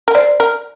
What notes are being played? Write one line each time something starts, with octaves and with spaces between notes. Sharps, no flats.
A#4
C5 D5
A#4